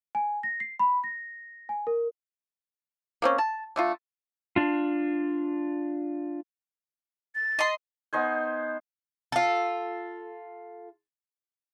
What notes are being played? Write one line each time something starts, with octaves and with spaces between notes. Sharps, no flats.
G#5
A#6
C7
B5
A#6
G#5
A#4
A#3 C4 C#4
A5
D3 A3 F4
D4 F4
A6
D#5 C6
B3 D#4 C5 G#5
F4 A4